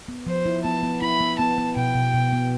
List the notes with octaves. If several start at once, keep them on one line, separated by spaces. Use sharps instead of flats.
B3
F3 C5
E4
B3 A5
B3
E4 B5
B3
B3 A5
B3
B2 G5
B2
B2
B3